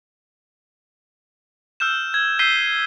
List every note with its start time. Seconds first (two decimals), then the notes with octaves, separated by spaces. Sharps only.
1.80 E6 F6 G6 E7
2.14 G#6
2.39 E6 G6 B6 C7 D#7 G7